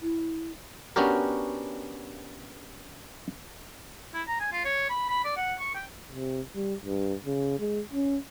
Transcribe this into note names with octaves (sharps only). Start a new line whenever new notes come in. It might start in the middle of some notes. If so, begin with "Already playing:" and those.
E4
B3 C#4 D4 F#4 G4 A#4
E4
A#5
G#5
F4
C#5
B5
B5
D5
F#5
C#6
G5
C3
G3
G2
C#3
G#3
C#4